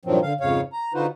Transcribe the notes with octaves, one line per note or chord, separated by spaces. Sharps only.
G2 A#2 D#3 F3 F#3 C4
D3 F5
F2 G#2 C#3 C#5 F5
A#5
D3 D#4 F4 F#4 B4 C5